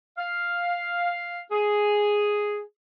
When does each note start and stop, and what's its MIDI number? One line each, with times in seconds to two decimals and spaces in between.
0.18 1.38 77
1.51 2.60 68